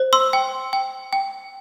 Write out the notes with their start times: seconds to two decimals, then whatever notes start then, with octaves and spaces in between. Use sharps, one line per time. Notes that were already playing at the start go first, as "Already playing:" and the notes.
Already playing: C5
0.13 C6 E6
0.33 G5
0.73 G5
1.13 G5